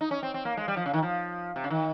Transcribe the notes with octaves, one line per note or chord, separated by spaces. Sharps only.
D#4
C#4
C4
C4
A#3
G#3
G3
F3
C#3
D#3
F3
C3
C#3
D#3